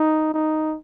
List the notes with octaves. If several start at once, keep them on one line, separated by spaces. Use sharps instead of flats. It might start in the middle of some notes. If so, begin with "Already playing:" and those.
Already playing: D#4
D#4